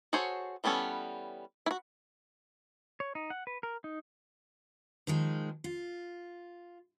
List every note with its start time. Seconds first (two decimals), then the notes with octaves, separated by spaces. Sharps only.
0.13 F#4 G#4 A4 C5 C#5
0.64 E3 G3 B3 C#4 A4
1.66 E4 F#4
3.00 C#5
3.15 D#4
3.30 F#5
3.47 B4
3.63 A#4
3.84 D#4
5.07 D#3 F3 G#3
5.64 F4